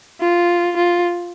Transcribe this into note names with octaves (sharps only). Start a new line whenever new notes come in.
F4
F4